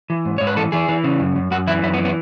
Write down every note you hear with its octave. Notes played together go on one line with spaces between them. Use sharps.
E3
G#2
G#2 C#5
B4
E3 A4
E3 G#4
E3
C#3
F#2
F#2
F#2 F#4
E3 E4
F#2 E4
B3
E3
B3